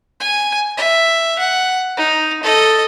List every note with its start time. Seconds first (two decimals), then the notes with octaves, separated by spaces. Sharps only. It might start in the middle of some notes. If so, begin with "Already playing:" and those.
0.20 G#5
0.77 E5
1.39 F#5
1.97 D#4
2.43 A4 D#5